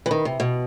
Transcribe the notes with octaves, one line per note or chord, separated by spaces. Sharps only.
E3
D#3
C3
B2